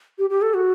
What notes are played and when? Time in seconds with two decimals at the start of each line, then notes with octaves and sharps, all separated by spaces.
0.18 G4
0.30 G4
0.42 A4
0.55 F#4